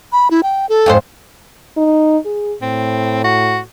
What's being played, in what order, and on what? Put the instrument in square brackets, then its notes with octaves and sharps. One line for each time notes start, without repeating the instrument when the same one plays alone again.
[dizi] B5
E4
G5
A4
[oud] F2 G#2 C5
[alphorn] D#4
G#4
[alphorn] A2 [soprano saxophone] C4
[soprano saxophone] F#4